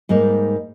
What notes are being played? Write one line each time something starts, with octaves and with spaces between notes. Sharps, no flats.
G#2 G3 A#3 D#4